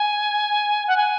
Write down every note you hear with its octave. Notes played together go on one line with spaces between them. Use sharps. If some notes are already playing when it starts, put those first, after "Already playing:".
Already playing: G#5
F#5
G#5